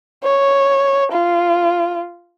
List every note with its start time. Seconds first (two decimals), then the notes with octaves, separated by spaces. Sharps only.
0.24 C#5
1.12 F4